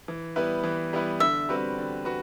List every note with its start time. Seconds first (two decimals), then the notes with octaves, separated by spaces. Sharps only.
0.08 E3
0.36 G3 B3 E4 B4
0.64 E3
0.93 G3 B3 E4 B4
1.20 D3 E5
1.49 G3 C4 F#4 B4
1.78 D3
2.05 F#4 B4